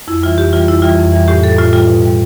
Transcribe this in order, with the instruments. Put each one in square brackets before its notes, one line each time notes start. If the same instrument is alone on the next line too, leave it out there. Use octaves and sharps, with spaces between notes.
[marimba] F2 E4
E3 G3 F4
F2 G4
E3 G3 F4
F2 E4
E3 G3 F4
F2
E3 G3
A2 G4
G3 A4
A2 F4
G3 F4
B2
G3